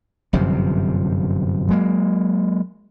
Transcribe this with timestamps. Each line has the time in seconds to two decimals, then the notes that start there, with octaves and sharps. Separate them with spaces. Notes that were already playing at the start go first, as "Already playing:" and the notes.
0.33 G1 F#2 C3 F3
1.68 F#3 G#3 A#3